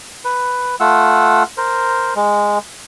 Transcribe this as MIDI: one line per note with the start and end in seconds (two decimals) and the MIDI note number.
0.25 0.75 71
0.80 1.43 57
0.80 1.43 65
0.80 1.43 78
0.80 1.43 88
1.57 2.14 70
1.57 2.14 72
2.16 2.59 56